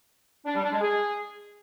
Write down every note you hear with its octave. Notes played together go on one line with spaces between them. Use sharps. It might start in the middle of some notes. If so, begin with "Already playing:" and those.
D4
G3
D4
G#3
G#4